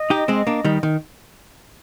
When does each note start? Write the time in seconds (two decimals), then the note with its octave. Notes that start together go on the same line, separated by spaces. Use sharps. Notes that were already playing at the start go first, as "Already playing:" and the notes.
Already playing: D#5
0.10 D#4 G4
0.28 G#3 C4
0.47 A#3 D4
0.65 D#3 G3
0.83 D#3